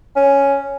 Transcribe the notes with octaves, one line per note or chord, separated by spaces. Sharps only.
C#4